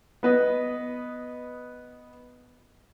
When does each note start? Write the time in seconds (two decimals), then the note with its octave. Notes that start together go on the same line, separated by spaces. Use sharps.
0.23 B3 B4 D#5